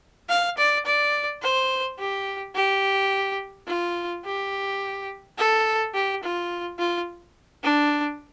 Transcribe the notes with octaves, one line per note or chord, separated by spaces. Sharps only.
F5
D5
D5
C5
G4
G4
F4
G4
A4
G4
F4
F4
D4